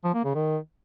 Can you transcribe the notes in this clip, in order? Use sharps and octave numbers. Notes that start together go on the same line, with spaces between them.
F3
A#3
C#3
D#3